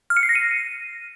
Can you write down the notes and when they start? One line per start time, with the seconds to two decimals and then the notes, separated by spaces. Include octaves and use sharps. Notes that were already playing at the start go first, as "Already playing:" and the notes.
0.10 F6
0.17 C#7
0.23 C7
0.29 A#6
0.35 D#7